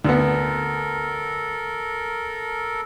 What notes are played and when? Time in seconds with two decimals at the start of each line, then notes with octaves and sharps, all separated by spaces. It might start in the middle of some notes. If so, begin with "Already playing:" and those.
0.05 D2 B3 A4 A#4